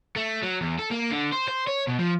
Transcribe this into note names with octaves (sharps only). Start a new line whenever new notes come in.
A3
F#3
E2
A4
A#3
D3
C5
C5
C#5
B2
F3